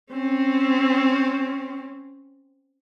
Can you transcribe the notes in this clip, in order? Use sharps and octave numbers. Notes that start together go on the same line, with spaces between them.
C4 C#4